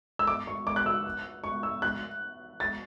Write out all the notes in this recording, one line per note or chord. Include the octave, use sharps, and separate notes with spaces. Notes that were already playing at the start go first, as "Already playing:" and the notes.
E6
D6
C#6
D6
F#6
E6
C#6
E6
F#6
A6